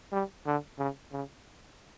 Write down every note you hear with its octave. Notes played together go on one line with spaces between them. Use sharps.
G3
D3
C#3
C#3